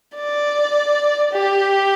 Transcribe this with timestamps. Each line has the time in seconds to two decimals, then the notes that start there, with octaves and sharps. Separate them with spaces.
0.16 D5
1.33 G4